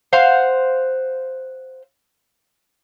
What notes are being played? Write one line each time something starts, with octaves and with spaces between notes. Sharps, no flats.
C5 F5 F#5